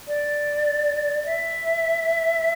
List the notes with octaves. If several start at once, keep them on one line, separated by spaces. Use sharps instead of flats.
D5
E5